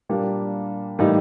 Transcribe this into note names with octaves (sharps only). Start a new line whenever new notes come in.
A#2 G3 A#3 D4
A2 E3 G3 A#3 D#4